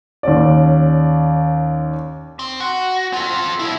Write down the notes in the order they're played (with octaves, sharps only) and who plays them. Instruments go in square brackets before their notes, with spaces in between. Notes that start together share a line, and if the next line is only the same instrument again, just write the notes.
[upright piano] D#2 C#4 D5
[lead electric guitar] C4
F#4
F4 A4
B2 E4